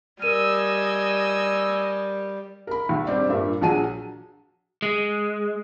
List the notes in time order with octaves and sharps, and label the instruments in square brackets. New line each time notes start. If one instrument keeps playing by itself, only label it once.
[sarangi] G3 [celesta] A#4 D#7 [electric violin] D#5 G#5 [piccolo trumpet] E6
[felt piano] A#4 B5
B1
G3 C4 D4
G2 A#2 E5
A#1 F#3 G#4 A5 D#7
[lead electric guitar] G#3